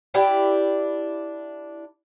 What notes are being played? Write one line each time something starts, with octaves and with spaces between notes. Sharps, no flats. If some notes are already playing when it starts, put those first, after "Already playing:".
D4 E4 G4 G5